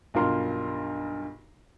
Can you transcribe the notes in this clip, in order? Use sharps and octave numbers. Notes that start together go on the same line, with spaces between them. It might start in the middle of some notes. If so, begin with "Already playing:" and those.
B1 G2 F4 A#4 C6